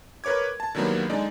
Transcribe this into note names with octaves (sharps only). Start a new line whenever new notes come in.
A#4 B4 C#5 D6 G#6
A5
D3 D#3 F#3 G3 A#3 B3
D3 G#3 D#4 D5